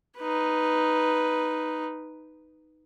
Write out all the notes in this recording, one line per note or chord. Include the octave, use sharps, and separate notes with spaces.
D#4 B4